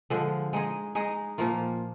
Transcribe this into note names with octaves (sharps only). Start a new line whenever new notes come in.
D3 F3 G#3
G#3 D#4 G#4
G#3 D#4 G#4
A#2 F3 A#3 F4